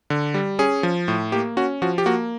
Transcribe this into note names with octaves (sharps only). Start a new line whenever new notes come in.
D3
G3
C#4 G#4
F3
A2
A#3 G4
C#4 F#4
F3 F#4
G4
A#3 F#4